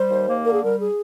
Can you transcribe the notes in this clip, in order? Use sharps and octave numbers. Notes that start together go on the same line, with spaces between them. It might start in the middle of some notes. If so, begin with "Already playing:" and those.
Already playing: G3 C5
D#2
A#3
D3 A#4
G#4
G3 A#4
G#4